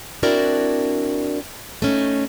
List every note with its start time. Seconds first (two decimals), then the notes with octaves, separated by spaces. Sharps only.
0.23 C4 D4 E4 F#4 A#4 D5
1.82 A3 C#4 D#4